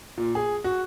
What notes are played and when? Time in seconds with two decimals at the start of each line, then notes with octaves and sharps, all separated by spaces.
0.18 A#2
0.35 G#4
0.64 F#4